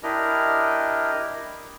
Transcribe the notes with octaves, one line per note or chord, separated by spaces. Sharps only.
D4 E4 G4 A#4 D#5 F6